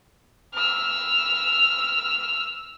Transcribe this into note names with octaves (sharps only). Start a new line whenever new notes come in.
E6 F6